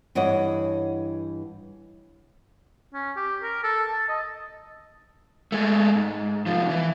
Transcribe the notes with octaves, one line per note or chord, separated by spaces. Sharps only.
G2 E3 C#5 D#5 F#5
C#4
G4
A#4
A4
A5
D#5
G#3 A3
G#2
C2 F3
E3